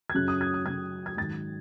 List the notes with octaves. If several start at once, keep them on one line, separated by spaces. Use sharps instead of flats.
G#6
F#2 C#3 F#3 F#6
D#6
G#6
F#6
F#2 C#3 F#3 G#6
G#6
G#2 D#3 F#3 A6